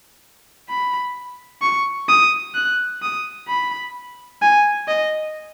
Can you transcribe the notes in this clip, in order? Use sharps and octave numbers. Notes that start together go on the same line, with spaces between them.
B5
C#6
D#6
F#6
D#6
B5
G#5
D#5